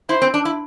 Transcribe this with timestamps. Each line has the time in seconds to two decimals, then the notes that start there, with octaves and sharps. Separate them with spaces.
0.09 E4 C5
0.22 C4
0.34 D4
0.45 E4